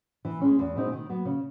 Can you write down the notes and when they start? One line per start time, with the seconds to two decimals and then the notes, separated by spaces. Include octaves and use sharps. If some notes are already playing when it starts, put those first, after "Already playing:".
0.25 E3
0.41 G#3 C#4
0.59 E2
0.76 B2 G#3 C4 D#4
0.92 D#3
1.09 F#3 B3
1.25 C#3